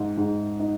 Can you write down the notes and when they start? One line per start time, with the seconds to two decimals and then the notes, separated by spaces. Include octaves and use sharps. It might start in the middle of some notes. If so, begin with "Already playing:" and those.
Already playing: G#2
0.17 G#2
0.59 D#4